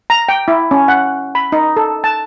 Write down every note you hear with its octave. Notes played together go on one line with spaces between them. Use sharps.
A#5
G5
E4
C#4
F#5
B5
D#4
A4
A5